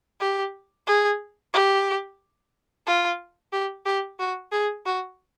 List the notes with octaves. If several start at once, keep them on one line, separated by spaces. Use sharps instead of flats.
G4
G#4
G4
F4
G4
G4
F#4
G#4
F#4